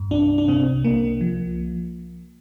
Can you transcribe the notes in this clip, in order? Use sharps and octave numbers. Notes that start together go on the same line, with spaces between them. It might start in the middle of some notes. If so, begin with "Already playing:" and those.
Already playing: G2
C2 D4
D4
C3 C4
C2 A#3
F3